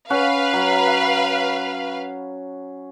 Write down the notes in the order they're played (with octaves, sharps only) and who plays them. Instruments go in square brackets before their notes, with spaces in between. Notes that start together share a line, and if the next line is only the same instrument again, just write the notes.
[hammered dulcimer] C#4 F#5 [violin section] B4 F5
[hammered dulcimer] F#3